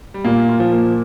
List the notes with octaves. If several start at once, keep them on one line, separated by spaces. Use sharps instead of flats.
G3
A#2 A#3
F4
F3
A#3